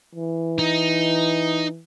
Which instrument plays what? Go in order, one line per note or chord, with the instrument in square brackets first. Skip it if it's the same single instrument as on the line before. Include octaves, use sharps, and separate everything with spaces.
[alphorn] E3
[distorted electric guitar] D#4